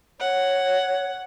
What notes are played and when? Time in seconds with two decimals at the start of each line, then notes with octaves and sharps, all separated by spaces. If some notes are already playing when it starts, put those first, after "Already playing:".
0.20 C#5 F#5